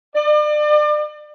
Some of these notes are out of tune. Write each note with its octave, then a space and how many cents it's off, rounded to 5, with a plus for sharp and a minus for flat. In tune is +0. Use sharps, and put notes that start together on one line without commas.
D5 +35